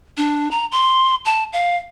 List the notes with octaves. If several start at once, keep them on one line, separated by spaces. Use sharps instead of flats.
D4
A#5
C6
A5
F5